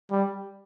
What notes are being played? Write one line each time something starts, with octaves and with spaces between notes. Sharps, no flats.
G3